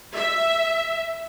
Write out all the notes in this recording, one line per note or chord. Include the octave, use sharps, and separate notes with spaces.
E5